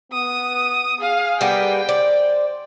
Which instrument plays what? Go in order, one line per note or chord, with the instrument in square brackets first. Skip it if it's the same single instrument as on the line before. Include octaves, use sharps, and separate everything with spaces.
[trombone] B3 [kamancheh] D#6
[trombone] G#4 [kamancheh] F5
[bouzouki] G3 A#3 B3 [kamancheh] G5
[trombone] C5 [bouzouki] D5